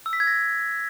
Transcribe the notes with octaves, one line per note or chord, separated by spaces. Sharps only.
E6
B6
G#6
A#6